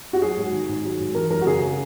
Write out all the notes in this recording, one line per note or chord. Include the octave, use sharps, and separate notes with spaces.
F#4
F#3 G#4
G#2
D#3
G#2
F#3
G#2
E3 A#4
F#2 A#4
F#4
C#3 G#4